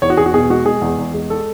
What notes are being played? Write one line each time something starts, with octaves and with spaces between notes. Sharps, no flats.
E2 C#5
F#4
E2 G#4
F#4
B2 G#4
G#3 F#4
G#3 G#4
E2
E2
G#3
A4